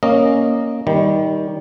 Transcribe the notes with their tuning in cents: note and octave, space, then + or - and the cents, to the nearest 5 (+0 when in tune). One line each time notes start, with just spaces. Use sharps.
A#3 +0 C#4 +0 D#5 -10
D#3 +20 G3 +0